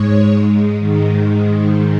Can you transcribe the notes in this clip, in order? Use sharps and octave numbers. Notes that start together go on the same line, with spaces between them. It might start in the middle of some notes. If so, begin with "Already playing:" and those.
Already playing: G#2 G#3 C#5
G#2 D#3 G#3